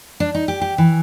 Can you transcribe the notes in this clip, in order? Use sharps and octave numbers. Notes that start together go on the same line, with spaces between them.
D4
D#4
G4
G4
E3